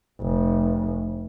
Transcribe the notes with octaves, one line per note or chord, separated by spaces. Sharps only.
F1